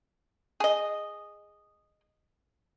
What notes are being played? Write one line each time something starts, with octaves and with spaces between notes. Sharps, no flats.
G#4 D#5